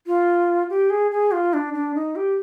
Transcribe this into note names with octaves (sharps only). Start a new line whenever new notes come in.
F4
G4
G#4
G#4
F4
D4
D4
D#4
G4